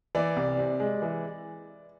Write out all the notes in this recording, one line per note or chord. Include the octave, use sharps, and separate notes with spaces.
E3 D5
C2
C3
G#3
E3